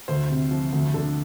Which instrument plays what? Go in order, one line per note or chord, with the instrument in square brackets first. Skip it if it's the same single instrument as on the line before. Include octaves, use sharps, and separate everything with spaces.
[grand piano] D2 C5
C3
F3
D2
D3